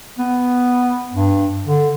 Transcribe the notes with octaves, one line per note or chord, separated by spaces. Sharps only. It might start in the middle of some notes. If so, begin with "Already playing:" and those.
B3
G2
D3